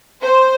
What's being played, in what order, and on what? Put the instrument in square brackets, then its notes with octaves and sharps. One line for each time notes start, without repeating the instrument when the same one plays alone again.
[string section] C5